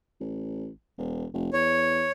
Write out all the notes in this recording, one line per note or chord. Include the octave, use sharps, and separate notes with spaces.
A1
E1
F1
E2 C#5